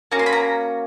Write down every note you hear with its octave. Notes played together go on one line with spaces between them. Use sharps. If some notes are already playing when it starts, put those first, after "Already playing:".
A#3 C#4 F#4 A#5
C6
B5
A#5